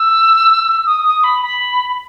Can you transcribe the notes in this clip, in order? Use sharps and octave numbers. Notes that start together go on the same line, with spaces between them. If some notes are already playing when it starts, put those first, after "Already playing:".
Already playing: E6
D#6
D#6
B5
B5